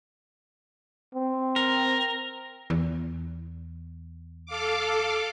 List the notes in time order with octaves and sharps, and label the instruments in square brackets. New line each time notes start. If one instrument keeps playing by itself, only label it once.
[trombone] C4
[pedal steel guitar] A#4
[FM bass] E2
[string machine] A4 F5 D6